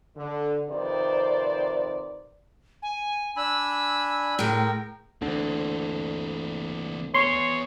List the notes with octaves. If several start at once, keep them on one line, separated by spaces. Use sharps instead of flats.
D3
F2 C3 D#3 B4 C5 D5
G#5
D4 G#5 B5 E6
A2 G#3 A#4 G5
D2 D3 E3 C4
B3 G#4 C#5 C6